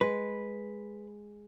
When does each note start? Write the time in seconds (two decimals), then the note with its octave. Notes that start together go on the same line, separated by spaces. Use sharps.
0.01 G#3 B4